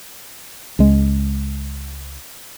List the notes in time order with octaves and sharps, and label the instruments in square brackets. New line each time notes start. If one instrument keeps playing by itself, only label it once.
[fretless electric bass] C#2 G#3